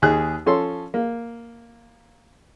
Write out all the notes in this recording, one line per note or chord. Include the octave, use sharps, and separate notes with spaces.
D#2 G#4 F#6
F3 C#4 A4 C6
A#3